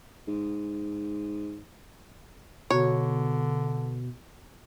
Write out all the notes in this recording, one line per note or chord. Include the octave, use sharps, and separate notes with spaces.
G#2
B2 D3 B3 F#4 C#5 A#5